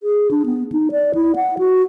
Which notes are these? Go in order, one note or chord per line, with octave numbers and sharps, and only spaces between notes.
G#4
D4
B3
D#4
D5
E4
F#5
F#4